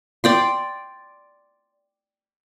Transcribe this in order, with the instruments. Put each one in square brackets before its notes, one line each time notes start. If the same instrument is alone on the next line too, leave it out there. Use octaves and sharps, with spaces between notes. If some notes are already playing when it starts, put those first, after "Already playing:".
[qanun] D5 G5 C6